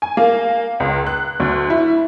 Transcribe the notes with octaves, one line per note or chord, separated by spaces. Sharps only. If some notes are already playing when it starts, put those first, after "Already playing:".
G#5
A#3
C#2
F#6
D2
E4